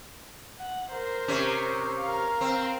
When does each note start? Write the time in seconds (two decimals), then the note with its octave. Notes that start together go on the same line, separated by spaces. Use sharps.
0.59 F#5
0.92 A#4 C5
1.28 C3 C#4
2.00 A#4 F5
2.41 C4